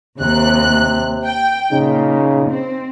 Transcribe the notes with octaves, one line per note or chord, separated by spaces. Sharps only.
D#2 C3 F#6
G5
A#2 C#3 D#4
C4